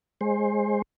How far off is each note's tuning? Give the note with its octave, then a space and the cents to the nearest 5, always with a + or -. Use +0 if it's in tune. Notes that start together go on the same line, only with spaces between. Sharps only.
G#3 +0 C5 +25